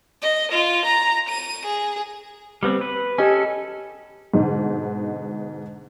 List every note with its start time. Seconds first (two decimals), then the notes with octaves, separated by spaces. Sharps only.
0.22 D#5
0.52 F4
0.86 A#5
1.29 D#7
1.66 G#4
2.63 G3 B3 C4
2.81 B4
3.18 C#4 G4 A4 D#5 G#5
4.34 G#2 B2 D3 D#4